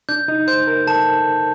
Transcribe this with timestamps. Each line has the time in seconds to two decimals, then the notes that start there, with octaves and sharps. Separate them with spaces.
0.09 D4 G6
0.28 D#4
0.48 C5 G6
0.67 A#4
0.87 A4 A5